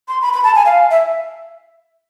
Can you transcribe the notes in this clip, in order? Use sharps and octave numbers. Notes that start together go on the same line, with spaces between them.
C6
B5
B5
A5
G#5
F5
E5